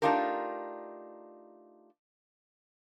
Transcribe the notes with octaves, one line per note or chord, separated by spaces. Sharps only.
A3 D4 D#4 F4 G4 A#4